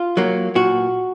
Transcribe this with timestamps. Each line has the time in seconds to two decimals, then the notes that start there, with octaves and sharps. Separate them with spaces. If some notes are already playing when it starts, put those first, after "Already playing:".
Already playing: F4
0.17 F#3 A#3
0.56 A#2 F#4